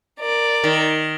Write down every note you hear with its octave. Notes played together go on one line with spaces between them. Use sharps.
A#4 D5
D#3